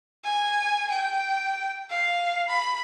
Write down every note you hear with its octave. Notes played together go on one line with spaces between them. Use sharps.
G#5
G5
F5
B5